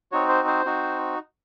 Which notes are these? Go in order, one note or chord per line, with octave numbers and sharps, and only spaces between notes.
C4 D#4 F#4 C#5
C5
C5
C4 D#4 F#4